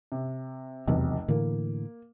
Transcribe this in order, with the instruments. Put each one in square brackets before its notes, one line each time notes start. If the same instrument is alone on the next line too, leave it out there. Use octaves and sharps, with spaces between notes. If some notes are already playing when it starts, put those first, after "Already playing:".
[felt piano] C3
[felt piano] F1 B1 [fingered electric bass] E2 C3
[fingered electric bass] A2 D3 E3 [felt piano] A#3